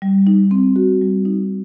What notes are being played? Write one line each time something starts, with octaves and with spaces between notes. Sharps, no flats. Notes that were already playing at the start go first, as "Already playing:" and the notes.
G3
D#4
C4
F#4
G3
D#4